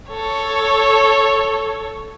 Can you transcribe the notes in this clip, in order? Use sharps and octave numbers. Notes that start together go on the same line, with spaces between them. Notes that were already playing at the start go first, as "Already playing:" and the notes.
A4 C#5